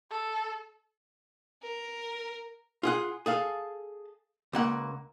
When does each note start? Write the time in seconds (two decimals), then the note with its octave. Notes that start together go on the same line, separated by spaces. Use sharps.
0.11 A4
1.63 A#4
2.83 F4 G#4 F#5
3.26 G#4 A4 F5
4.53 C#2 A#3 F#5